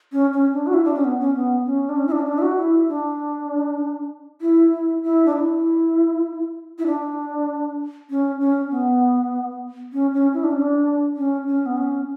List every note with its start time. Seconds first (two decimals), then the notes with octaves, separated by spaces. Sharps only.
0.12 C#4
0.33 C#4
0.53 D4
0.67 F#4
0.74 E4
0.84 D4
0.95 C#4
1.04 B3
1.20 C#4
1.35 B3
1.66 C#4
1.89 D4
1.96 C#4
2.07 E4
2.12 D4
2.19 C#4
2.27 D4
2.38 E4
2.42 F#4
2.58 E4
2.89 D4
4.41 E4
4.73 E4
5.03 E4
5.26 D4
5.33 E4
6.78 E4
6.86 D4
8.10 C#4
8.40 C#4
8.71 B3
9.93 C#4
10.14 C#4
10.34 E4
10.44 D4
10.52 C#4
10.62 D4
11.16 C#4
11.47 C#4
11.66 B3
11.77 C#4